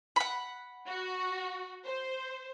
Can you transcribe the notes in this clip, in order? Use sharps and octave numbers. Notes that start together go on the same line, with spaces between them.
F#5 B5
F#4
C5